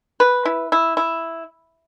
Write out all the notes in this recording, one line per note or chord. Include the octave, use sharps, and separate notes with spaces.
B4
E4
E4
E4